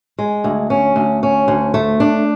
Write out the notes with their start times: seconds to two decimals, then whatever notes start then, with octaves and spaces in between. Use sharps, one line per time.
0.19 G#3
0.44 D2
0.70 C#4
0.96 D2
1.23 C#4
1.48 D2
1.74 A3
2.00 D4